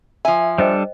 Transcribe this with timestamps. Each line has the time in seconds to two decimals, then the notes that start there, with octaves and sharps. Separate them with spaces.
0.25 F3 E5 G#5
0.58 G3 D4 A4 C5 D#5 G5